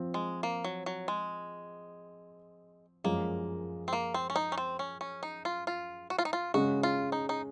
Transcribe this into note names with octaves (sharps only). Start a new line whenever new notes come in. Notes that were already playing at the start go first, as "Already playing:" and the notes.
Already playing: F3 C4
G#3
A#3
F#3
F#3
G#3
F#2 F3 G#3 A#3
C4
A#3
C4
C#4
D#4
C#4
C4
C#4
C#4
D#4
F4
F4
F#4
F4
D#4
F4
C#3 G#3 C#4 F#4
F4
D#4
D#4